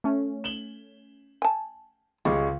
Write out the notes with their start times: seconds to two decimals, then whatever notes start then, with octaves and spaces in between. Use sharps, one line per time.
0.04 A3 C#4
0.44 E7 F#7 G7
1.42 G#5 A5
2.25 C#2 G3 G#3 C#6